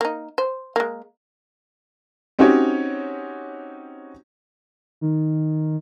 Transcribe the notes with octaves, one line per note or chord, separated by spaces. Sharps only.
A#3 D#4
C5
G#3 A#3
C4 C#4 D#4 F#4 G4 C#5
D#3